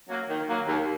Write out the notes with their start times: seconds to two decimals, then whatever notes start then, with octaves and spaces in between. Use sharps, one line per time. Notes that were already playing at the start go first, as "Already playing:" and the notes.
0.09 F#3 A#3
0.28 D#3
0.48 F#3 A#3
0.66 D#2